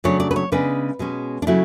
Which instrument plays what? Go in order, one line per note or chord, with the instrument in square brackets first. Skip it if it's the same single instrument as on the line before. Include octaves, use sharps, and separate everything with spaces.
[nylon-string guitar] C#3 F#3 A3 D4 C#5
D5
B4
C#5
C#3 G#3 B3 D4 B4
B2 G#3 C#4
D4
C#3 F#3 A3 E4